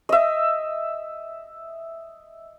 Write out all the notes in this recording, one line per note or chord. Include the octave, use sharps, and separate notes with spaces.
D#5 E5